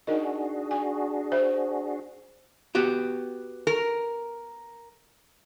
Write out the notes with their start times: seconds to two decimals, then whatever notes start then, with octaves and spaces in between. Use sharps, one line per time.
0.07 D4 D#4 F#4 G#4 A#4 D#5
0.71 G#5
1.32 C5 E5
2.75 B3 F#4 G4
3.67 A#4